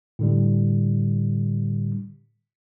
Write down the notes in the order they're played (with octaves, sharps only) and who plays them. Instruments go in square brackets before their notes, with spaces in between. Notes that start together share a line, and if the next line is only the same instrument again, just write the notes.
[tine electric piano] A2 D3 G3